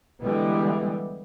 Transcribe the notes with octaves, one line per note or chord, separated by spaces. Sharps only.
D3 E3 G3 G#3 B3